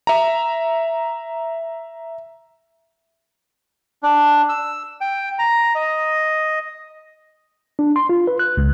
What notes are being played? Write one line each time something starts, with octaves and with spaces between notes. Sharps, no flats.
E5 A#5
D4
E6
G5
A#5
D#5
D4
C6
F4
B4
F#6
C#2